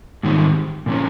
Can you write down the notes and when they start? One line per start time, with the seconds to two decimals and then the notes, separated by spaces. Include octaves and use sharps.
0.23 G#2 D#3 G3 C4
0.86 A#2 F3 A#3 C#4